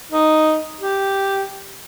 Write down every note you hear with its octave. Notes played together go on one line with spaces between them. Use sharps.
D#4
G4